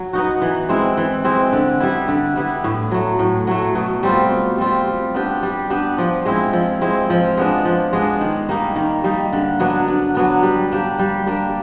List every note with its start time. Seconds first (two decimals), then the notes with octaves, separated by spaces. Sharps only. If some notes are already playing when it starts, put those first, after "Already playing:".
Already playing: F#3
0.13 B3 D#4 F#4
0.42 E3
0.69 G#3 C4 E4
0.97 E3
1.25 G#3 C4 E4
1.53 D3
1.80 G3 B3 E4
2.08 D3
2.36 G3 B3 E4
2.64 A2
2.91 F#3 A3
3.19 A2
3.47 F#3 A3
3.75 B2
4.03 G3 C4 F4
4.31 B2
4.58 G3 C4 F4
4.87 G3
5.14 B3 D4 G4
5.43 G3
5.70 B3 D4 G4
5.98 F3
6.26 G#3 C4 E4
6.53 F3
6.81 G#3 C4 E4
7.10 F3
7.37 G#3 B3 D4
7.65 F3
7.93 G#3 B3 D4
8.21 D#3
8.49 G3 A#3 D#4
8.76 D#3
9.04 G3 A#3 D#4
9.33 D3
9.60 F#3 B3 D4
9.88 D3
10.15 F#3 B3 D4
10.43 G3
10.72 A#3 D4 G4
10.99 G3
11.27 A#3 D4 G4